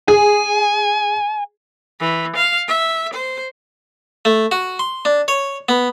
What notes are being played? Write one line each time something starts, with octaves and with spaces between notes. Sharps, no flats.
G#4 G#5
E3
F5
E5
C5
A3
F#4
C6
D4
C#5
B3